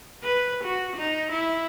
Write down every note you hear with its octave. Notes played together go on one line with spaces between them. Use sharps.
B4
F#4
D#4
E4